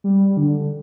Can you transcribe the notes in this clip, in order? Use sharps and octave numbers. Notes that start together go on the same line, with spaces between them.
G3
D3